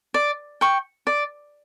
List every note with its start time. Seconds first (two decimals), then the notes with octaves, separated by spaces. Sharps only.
0.14 D5
0.61 G5 C#6
1.07 D5